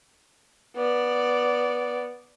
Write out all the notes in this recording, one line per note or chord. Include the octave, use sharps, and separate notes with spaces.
B3 D5